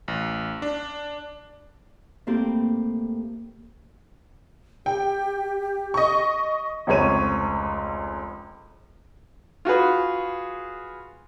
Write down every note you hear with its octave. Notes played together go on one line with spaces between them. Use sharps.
A1
D4
A2 A#3 C4 G4
G4 G5
D#5 C#6
F1 C#2 C4 C#5 D#7
F4 F#4 G#4 B4